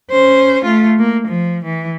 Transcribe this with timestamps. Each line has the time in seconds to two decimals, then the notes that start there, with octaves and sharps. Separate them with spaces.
0.11 C#4 C5
0.64 A3 F4
0.99 A#3
1.28 F3
1.65 E3